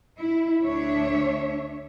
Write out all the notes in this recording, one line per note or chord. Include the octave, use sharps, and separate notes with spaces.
E4
D2 D4 C#5 E5